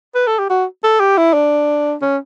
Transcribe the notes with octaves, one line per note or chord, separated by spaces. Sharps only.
B4
A4
G4
F#4
A4
G4
E4
D4
C#4